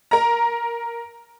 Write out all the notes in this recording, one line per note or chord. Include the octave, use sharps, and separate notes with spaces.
A#4 A#5